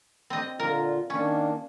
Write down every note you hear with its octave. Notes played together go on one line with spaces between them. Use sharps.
C4 D#5
A#2 D3 F4 A#4
D#3 A#3 C#4 D4